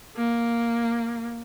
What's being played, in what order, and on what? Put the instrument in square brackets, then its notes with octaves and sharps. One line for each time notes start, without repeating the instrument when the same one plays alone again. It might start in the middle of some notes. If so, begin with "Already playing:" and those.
[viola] A#3